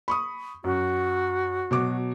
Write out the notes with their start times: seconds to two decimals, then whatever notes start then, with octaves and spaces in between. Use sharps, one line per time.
0.08 B5 C#6 D#6
0.64 F#2 F#4
1.71 B2 F#3 D6